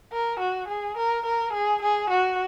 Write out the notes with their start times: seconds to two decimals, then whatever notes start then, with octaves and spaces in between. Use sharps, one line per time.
0.12 A#4
0.40 F#4
0.68 G#4
0.98 A#4
1.26 A#4
1.53 G#4
1.82 G#4
2.10 F#4